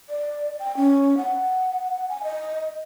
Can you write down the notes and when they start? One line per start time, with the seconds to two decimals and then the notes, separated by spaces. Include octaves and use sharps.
0.09 D5
0.59 G5
0.77 C#4
1.17 F#5
2.09 G#5
2.23 D#5